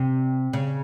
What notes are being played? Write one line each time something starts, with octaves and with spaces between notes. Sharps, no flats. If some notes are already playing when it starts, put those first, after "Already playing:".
Already playing: C3
C#3